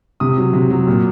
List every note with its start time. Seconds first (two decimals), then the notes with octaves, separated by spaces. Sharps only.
0.20 C3 D#6
0.37 F#3
0.53 C3
0.70 F#3
0.87 A#2